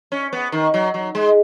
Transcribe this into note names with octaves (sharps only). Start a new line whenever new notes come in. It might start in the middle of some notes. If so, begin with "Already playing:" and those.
C#4
B3
D#3
F#3
F#3
G#3